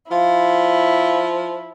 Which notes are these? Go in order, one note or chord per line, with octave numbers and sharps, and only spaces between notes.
F3 E4 F5